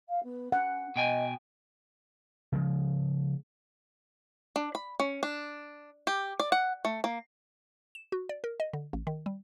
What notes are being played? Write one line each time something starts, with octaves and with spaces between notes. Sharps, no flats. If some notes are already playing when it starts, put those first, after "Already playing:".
F5
B3
C#4 F#5
B2 D#5 G5 G#5
C#3 F3 G#3
D4
B5
C#4
D4
G4
D5
F#5
A3
A#3
E7
F#4
D5
A#4
D#5
D3
A1
D#3
G3